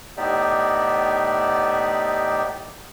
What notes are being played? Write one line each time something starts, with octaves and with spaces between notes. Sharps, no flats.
A2 B3 D#4 G4 D5 E5